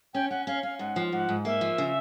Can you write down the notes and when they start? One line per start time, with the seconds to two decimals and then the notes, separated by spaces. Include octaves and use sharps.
0.14 C#4 G5
0.30 C#4 F#5
0.47 C#4 F5
0.63 C#4 F5
0.79 G#2 F#5
0.96 F3
1.12 G#2 F#5
1.29 G#2
1.45 A#3 E5
1.61 F3
1.78 C#3